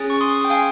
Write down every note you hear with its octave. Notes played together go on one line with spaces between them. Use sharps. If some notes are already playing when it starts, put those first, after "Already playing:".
Already playing: C#4 G#4
C#6
C6 D#6
G5
F5 G#5